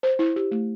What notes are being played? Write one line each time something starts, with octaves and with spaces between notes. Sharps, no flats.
C5
E4
G4
A3